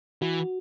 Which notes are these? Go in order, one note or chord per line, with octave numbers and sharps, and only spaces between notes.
E3 F#4